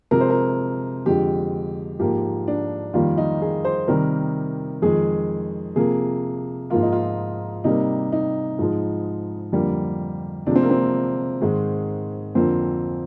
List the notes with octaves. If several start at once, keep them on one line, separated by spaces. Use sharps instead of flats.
C3 F3 G#3 A#4
C5
A#4
F2 D3 G#3 G4
G#2 F3 A#3 G4
D4
F2 D#3 G3 A#3 F4
D#4
G#4
C5
C3 D#3 G3 A#4
F2 D#3 G#3 G#4
C3 F3 A#3 G#4
G#2 F3 A#3 F4
D#4
F4
C3 G3 A#3 D#4
D#4
G#2 F3 G#3
F2 D3 G3 A#3
C3 F3 G#3 D4
C4
A#3
C4
G#2 D#3 G#3
F2 D3 F3 A#3 C4